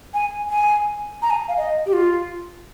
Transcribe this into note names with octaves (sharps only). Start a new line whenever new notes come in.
G#5
G#5
A#5
G#5
F5
D#5
G4
F4